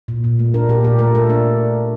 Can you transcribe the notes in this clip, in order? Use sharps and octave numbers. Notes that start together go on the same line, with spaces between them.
A#2
A#2
A3
D4 A#4
A#2 G4
A#2 G4
A3 A#4
A3 A4
D4